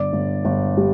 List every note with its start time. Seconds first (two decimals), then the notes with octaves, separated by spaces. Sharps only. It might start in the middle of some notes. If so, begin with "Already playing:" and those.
Already playing: G1 D5
0.13 G1
0.45 G1
0.77 G3